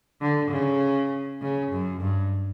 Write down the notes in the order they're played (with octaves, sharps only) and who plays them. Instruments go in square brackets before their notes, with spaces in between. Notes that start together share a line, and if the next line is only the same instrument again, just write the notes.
[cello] D3
C#3
C#3
F#2
G2